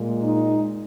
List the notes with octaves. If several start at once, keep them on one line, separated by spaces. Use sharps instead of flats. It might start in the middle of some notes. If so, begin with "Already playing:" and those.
Already playing: A#2 G#3
D#4